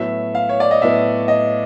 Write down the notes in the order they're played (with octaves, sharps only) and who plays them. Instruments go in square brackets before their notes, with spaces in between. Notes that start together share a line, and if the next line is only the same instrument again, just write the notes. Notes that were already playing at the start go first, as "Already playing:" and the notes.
Already playing: [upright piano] A2 F#3 B3 [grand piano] E5
[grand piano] F5
C#5
D5
D#5
[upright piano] A2 F#3 B3 [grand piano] E5
[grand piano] D#5